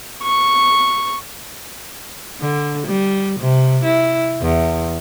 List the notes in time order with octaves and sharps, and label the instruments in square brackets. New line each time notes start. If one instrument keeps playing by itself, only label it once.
[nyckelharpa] C#6
[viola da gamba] D3
G3
C3
E4
E2